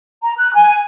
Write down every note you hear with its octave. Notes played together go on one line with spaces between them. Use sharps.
A#5
F#6
G#5